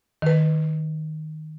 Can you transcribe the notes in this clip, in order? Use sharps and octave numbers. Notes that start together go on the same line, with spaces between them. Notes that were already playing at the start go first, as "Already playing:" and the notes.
D#3 B4